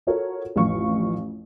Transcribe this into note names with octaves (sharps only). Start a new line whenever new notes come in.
F4 F#4 A4 A#4 C#5
A1 F2 F5 C#6